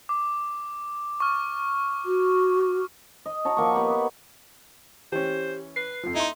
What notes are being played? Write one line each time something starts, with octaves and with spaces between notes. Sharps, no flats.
D6
C#6 F6
F#4
D#5
D#4 F#4 C#5 A5
F3 A#3 C#6
B3 G4 F#5
B4
E3 C#4 G4 C5
B4 C7
F2 F3
D#4 E4 E5 C6